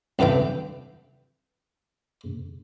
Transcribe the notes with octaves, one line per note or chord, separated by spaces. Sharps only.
C2 G2 D3 E3 G5